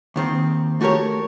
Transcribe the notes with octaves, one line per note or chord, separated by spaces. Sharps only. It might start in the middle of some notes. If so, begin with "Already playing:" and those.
D#2 D#3 C4
A3 F#4 G4 A#4 C#5